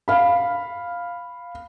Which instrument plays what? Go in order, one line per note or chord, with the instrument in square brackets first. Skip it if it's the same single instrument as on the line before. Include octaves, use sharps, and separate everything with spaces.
[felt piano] F5 B5